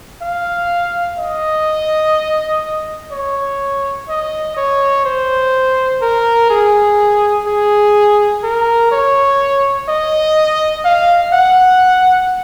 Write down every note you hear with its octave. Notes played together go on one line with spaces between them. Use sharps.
F5
D#5
C#5
D#5
C#5
C5
A#4
G#4
G#4
A#4
C#5
D#5
F5
F#5